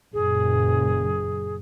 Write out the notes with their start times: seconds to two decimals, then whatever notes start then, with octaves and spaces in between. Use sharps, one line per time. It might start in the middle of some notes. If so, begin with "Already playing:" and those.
0.13 F#1 A#2 G#4